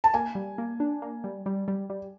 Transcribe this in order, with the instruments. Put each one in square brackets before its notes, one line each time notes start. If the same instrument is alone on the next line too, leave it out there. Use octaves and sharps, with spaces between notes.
[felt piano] A5
[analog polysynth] A#3 [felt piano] G#5
[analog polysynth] G3
A#3
D4
A#3
G3
G3
G3
G3